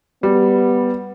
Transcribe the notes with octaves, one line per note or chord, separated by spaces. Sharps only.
G3 B3